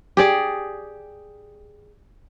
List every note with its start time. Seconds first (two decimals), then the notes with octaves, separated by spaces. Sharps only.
0.17 G4 G#4 D5